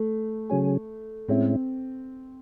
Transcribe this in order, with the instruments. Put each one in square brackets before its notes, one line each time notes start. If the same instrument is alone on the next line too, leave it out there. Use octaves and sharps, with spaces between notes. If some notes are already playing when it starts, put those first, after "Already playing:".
Already playing: [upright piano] A3
[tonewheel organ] C#3 F#3 C#4 G#4
[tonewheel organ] A2 G#3 C#4 E4 [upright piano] C4